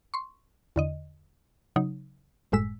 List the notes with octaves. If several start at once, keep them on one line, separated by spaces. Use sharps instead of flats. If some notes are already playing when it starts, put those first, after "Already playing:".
C6 C#6
E2 D3 D#5
C#3 F#3 D#4
G1 F#2 A2 G#3 E6 B6